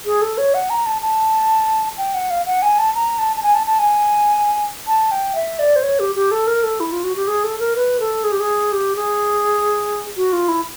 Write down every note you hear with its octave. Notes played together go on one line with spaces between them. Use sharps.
G#4
A4
C#5
F#5
A#5
A5
A5
G5
F#5
F5
F#5
G#5
A5
A#5
A5
A5
G#5
A5
A5
G#5
A5
G5
E5
D5
C5
C#5
G4
G4
A4
A#4
A4
E4
F4
F#4
G4
G#4
A4
A#4
B4
A4
G#4
G4
G#4
G4
G#4
F#4
F4
E4